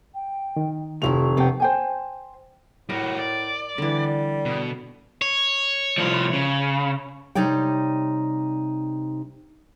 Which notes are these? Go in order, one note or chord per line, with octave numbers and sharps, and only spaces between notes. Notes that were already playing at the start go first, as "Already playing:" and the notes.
G5
D#3
F1 C2 F3 E4 C#6 F7
C3 A#3 B3 A4 G5
C5 G5 G#5
A2 G3 F#4 A#4
D5
D3 E3 G3
B2
C#5
C2 F3
C#3
C3 G3 D#4 C#5 D5 G5